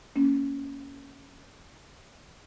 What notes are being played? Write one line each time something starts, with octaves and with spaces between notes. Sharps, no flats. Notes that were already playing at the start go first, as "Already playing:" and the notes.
A#3 C#4